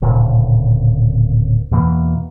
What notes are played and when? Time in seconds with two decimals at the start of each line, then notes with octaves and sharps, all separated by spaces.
0.02 D1 A#2 C#3
1.71 E2 B2 E3 A#3